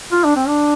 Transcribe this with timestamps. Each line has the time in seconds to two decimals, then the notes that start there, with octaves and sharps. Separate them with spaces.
0.12 F4
0.24 D4
0.36 C4
0.48 D4